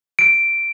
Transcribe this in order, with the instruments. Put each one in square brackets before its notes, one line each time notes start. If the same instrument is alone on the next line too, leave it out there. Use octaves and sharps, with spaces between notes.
[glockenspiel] D7